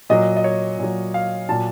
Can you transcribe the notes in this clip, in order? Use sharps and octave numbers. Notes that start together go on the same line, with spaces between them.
A#2 F#3 D#5
D#5
C#5
A#2 F#3
F5
A#2 F#3 A5